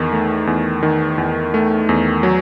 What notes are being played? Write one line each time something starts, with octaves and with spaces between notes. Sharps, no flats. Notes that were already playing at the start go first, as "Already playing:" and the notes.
Already playing: E2 D#3
A3
E2
D#3
E2
A3
E2
F#3